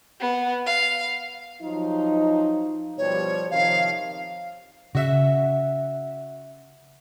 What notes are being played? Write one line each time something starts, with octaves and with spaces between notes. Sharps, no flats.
B3
F5
F3 F#3 D#4
B2 F3 G3 C#5
C3 D#3 F3 F5
C#3 F#4 E5